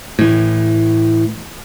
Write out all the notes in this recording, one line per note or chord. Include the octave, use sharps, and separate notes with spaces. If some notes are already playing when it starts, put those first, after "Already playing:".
A2 E3